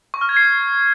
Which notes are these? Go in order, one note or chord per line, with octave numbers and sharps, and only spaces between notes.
C#6
F6
G#6
C7